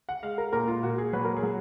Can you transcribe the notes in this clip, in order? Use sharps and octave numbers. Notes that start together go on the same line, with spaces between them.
F#5
G#3 F5
A#4
A#2 A#4
F4
A#2 F#4
G#4
F#3 B4
A#4
G#4
F#3